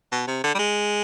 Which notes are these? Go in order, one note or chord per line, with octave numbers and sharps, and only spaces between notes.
B2
C3
D3
G3
G#3